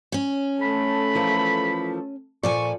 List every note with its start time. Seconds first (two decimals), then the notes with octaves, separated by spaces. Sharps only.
0.12 C#4 C#5
0.61 A3 A4 B5
1.15 E3 F3 A#4
2.43 A#2 F3 A4 D5 G#5 C#6